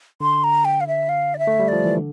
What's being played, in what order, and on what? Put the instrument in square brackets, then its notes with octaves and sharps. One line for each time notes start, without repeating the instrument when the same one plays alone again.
[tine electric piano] D3 [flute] C6
[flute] A#5
G5
F5
E5
F5
D5
E5
[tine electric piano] A3
G3
[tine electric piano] F3 [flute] D5
[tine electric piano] E3
D3